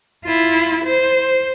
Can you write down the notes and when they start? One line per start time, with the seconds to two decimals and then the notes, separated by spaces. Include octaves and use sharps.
0.24 E4 F4
0.84 C5